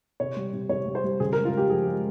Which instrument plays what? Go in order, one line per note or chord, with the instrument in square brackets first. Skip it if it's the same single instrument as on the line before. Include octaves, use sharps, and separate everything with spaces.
[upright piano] C3 C#5
G3
C3
C3 C#5
G3
C5
G3
C#3 G#4
A#4
G#3
F4
G#3 G4
F3 G#4
G#3